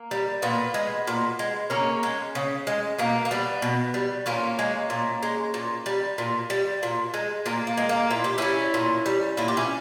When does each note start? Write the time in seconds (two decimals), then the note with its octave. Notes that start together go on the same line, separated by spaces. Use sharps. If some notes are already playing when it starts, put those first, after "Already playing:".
Already playing: A#3
0.11 G3
0.42 A#2 B3
0.74 G#3
1.07 A#2
1.39 G#3
1.70 C#3 A#3 C#4
2.03 G#3
2.35 C#3
2.67 G#3
2.99 B2 A#3
3.25 A#3
3.31 G3 B3
3.62 B2
3.94 G3
4.26 A#2 A#3 C#4
4.59 G#3
4.90 A#2
5.23 G#3
5.54 A#2
5.86 G3
6.18 A#2
6.50 G3
6.83 A#2
7.14 G#3
7.46 A#2 A#3
7.67 A#3
7.77 G#3
7.89 A#3
8.10 A#2 E4
8.24 G4
8.38 G3 C#4 E4
8.74 A#2
9.06 G3
9.37 A#2 E4
9.48 G4
9.57 C#4 E4